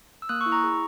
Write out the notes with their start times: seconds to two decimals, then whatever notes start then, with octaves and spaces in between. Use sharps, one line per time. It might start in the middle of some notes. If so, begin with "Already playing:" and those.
0.22 E6
0.29 A#3 D#6 F#6
0.41 C#6 E6
0.46 E4
0.52 A#5 C#6
0.64 G#4